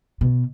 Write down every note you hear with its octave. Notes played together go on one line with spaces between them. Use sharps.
B2